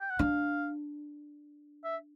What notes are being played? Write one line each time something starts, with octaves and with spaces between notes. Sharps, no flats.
G5
F#5
D4 F5
E5